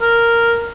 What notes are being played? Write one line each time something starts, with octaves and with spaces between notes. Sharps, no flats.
A#4